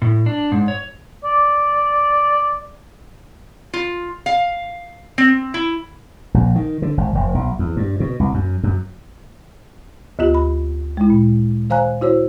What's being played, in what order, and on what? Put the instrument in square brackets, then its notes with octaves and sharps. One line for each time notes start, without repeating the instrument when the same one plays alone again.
[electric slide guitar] A2
D4
G#2
C#5
[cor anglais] D5
[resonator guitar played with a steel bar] F4
F5
C4
E4
[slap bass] A#1
D#3
D3
G#1
F1
B1
E2
G2
B2
C2
F#2
F#2
[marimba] D2 B3 F4 G4
B5
G#3 E4
A#2
D#3 C5 F5 G#5 A#5 F#6
E4 F#4 C5 C#5